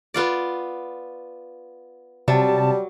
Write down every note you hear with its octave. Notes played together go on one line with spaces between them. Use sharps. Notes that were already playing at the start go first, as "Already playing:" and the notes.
B3 F4 D5
C3 F#3 G3 A5